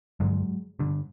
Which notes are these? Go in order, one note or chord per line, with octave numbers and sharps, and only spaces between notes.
G2 D3 F#3 G#3
G2 D3